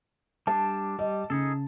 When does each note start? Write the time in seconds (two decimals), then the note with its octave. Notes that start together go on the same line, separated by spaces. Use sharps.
0.47 G3 D4 A5
0.99 G3 D#5
1.30 C#3 D#4 G#4 A4